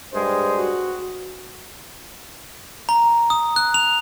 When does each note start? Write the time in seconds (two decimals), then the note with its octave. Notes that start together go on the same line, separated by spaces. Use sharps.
0.13 G2 G#3 C5
0.55 F#4
2.89 A#5
3.30 D#6
3.56 F#6
3.74 F7